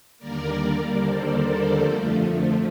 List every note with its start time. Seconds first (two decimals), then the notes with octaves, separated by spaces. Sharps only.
0.18 D#2 D3 G3 A#3 A#4 D5
0.96 A4 C5
1.74 F2 D3 F3 A3